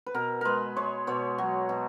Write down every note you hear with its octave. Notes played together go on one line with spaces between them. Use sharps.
B4
B2 A#4
G#3 A#4 B4
G#3 C#5
B2 C#5
F#3
B2